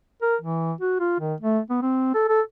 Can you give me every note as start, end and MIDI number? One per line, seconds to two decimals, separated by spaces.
0.22 0.36 70
0.41 0.73 52
0.81 0.98 66
1.00 1.16 65
1.20 1.35 51
1.41 1.59 57
1.70 1.79 59
1.82 2.11 60
2.15 2.28 69
2.29 2.41 69